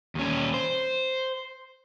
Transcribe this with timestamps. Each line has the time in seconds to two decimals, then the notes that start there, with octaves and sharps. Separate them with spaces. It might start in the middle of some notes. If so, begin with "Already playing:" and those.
0.15 D#2 C#4
0.54 C5